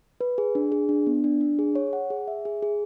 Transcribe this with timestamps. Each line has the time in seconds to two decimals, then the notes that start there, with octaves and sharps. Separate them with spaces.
0.21 B4
0.38 G#4
0.55 D4
0.72 G#4
0.89 D4
1.07 B3
1.24 D4
1.41 D4
1.59 G#4
1.75 C#5
1.93 F#5
2.10 G#4
2.28 E5
2.45 G#4
2.62 G#4